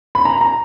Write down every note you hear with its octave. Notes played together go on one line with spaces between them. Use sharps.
B5
A#5
A#5